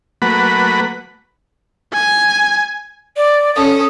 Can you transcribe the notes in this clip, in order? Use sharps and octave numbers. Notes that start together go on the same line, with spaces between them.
F#3 A3 A#3 B4 F#5 B5
G#5
D5
C#4 A4 D#6